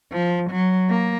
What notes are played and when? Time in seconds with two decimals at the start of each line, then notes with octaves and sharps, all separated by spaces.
0.12 F3
0.50 F#3
0.90 A#3